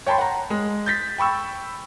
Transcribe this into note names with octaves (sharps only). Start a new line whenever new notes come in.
C#5 G5 A5 B5 C6
F#5 A#5
G#3
G6 A6 B6
G5 B5 C#6 E6